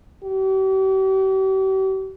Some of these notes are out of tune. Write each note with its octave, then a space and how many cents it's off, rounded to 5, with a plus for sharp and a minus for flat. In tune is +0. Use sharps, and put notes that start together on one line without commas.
G4 -40